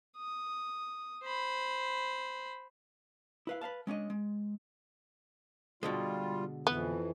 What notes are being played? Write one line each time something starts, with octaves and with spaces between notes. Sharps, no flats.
D#6
C5 B5
E4 B4 F5
B4 C5 F5 A5
G#3 C#4 D4 D#5
G#3
B2 D3 G3 G#3 F4
F2 E3 B3